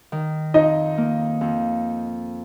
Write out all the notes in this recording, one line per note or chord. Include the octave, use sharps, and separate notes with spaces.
D#3
F2 D#4 D#5
A#3
F2